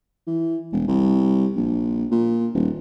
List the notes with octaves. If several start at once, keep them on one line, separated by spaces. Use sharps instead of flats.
E3
E1
C2
A#1
A#2
D#1